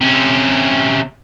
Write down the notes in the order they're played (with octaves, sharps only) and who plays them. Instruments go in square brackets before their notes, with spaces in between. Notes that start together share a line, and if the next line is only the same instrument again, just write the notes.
[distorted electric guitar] C3 C#4